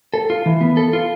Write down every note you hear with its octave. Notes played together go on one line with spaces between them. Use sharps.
A4
F4
E3
B3
A4
F4